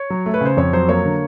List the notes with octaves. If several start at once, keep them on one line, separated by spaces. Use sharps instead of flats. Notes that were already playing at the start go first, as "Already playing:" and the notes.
Already playing: C#5
F#3
A3
B4
C#3 C5
F2 C#5
F#3 C5
A#3 C#5
D3